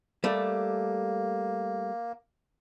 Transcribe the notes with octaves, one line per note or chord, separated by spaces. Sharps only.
G3 A3 A#3